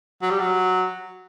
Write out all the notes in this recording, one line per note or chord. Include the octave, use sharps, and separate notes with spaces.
F#3
G3
F#3